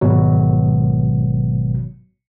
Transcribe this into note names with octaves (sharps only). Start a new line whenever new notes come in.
G#1 B2 F#3